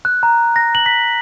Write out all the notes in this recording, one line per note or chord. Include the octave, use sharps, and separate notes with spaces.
F#6
A#5
A#6
F#7
B6